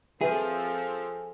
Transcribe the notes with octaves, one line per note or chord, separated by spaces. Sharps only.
F3 C4 G#4 A4 B4 E5